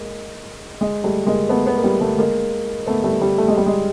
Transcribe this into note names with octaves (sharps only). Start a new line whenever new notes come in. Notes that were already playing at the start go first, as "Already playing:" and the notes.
Already playing: G#3 A#3
G#3
G3 A3
G#3 A#3
A3 B3
A3 B3
A#3
G3 A3
G3 A3
G#3 A#3
A3 B3
G3 A3
G3
A3
G#3
G3
G#3